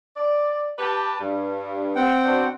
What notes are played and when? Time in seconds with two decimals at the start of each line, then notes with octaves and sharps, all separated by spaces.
0.17 D5
0.79 G4 B4 A5
1.20 G2
1.96 C4 F#5 G5
2.24 B2 D4 C5